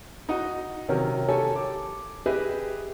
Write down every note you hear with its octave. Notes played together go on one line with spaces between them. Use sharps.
D#4 F#4 D#5
C3 D#3 F#3 C#4 A#4
G4 A4 C#5 G#5 A5
D6
G4 G#4 B4 D#5 E5